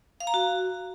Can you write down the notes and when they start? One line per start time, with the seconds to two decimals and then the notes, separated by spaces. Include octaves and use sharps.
0.20 F5
0.27 A#5
0.34 F#4